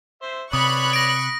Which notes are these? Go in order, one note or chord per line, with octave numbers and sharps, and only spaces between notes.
C5 E5
C3 B4 C#5 D5 B5 C#6 D#6 F#6
A#6 D7